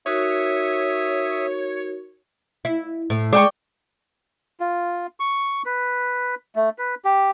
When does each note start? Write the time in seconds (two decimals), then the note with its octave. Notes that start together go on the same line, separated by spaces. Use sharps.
0.06 D#4 F#4 A#4 C#5 E5 D#6
2.65 E4
3.10 A2
3.33 G#3 D5 G5 C#6
4.60 F4
5.20 C#6
5.66 B4
6.56 A3
6.78 B4
7.05 G4